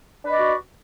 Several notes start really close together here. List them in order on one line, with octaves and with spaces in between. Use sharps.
D4 B4 D#5 D5 F#4